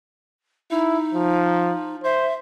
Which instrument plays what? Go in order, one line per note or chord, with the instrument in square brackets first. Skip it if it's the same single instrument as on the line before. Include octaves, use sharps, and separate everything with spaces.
[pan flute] D#4 [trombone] E4
[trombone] F3
[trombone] C5 [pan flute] E5